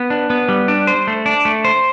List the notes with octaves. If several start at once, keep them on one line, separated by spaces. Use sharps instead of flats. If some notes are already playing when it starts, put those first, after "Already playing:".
Already playing: B3
D4
B3
G3
D4
C5
A3
D4
A3
C5